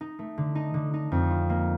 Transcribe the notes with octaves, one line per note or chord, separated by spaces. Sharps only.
D#4
A3
D3
D#4
D3
D#4
F2
F4
A#3